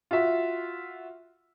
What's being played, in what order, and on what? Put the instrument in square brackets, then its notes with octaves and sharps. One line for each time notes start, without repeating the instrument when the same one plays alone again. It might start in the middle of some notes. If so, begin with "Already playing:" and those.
[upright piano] F4 F#4 E5